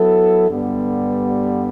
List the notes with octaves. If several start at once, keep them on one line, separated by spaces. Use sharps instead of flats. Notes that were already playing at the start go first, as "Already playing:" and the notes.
Already playing: F#3 B3 E4 A4
G2 D3 G3 B3